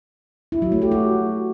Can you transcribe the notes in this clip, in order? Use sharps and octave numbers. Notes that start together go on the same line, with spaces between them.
E4
F#3
A3
G4
F#4